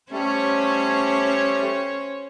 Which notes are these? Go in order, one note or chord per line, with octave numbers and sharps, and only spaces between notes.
G3 A3 C#4 C5 C#5